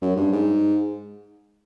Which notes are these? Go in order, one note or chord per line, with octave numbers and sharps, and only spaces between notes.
F#2
G2
G#2